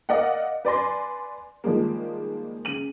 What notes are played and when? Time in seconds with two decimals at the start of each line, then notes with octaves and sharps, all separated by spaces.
0.09 A#4 D5 D#5 F5 F#5
0.65 B4 D5 G#5 C6 A#6
1.64 D#3 F3 G3 G#3 A#3
2.65 C#3 D#7 F#7